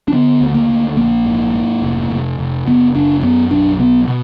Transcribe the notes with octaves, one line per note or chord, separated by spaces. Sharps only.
D4
D3 B3
D2
A#3
D2
A#1 A#3
G#2
G#2
F1
F1
F1
F#1 B3
F#1 D4
F#2 B3
B1 D4
B2 B3
B2